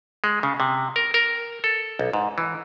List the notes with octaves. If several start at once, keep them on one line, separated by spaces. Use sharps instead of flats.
G#3
C#3
C3
A#4
A#4
A4
B1
G#2
E3